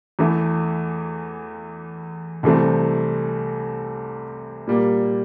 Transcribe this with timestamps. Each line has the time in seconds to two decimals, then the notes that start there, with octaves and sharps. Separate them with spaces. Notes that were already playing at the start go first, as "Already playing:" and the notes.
0.19 E2 E3 A3
2.43 C2 C3 E3 A3 C4
4.67 A#2 G3 A#3